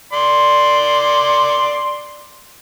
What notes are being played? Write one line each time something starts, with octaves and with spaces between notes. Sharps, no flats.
D5 C6